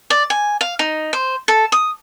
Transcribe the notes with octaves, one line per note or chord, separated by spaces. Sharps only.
D5
G#5
F5
D#4
C5
A4
D#6